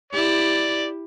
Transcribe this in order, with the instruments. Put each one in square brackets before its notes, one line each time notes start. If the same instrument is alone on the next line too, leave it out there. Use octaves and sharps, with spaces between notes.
[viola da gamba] E4 G4 [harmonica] D5